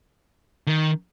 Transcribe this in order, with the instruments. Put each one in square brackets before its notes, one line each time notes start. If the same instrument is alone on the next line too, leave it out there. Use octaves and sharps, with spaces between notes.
[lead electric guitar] D#3